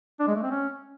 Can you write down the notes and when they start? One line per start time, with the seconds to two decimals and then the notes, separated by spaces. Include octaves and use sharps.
0.20 D4
0.28 G#3
0.35 A3
0.43 C4
0.51 C#4